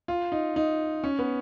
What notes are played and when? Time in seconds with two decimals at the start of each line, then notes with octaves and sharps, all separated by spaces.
0.08 F4
0.32 D#4
0.56 D#4
1.04 C#4
1.19 B3